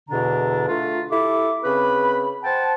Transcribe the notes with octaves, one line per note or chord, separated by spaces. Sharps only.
E2 B2 D3 D4 A#5
A3 D4 F4
E4 G4 A4 D6
C#3 C4 B4 B5
C5 F#5 G5 A5